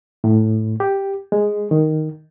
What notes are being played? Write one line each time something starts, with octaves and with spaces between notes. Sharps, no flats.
A2
G4
G#3
D#3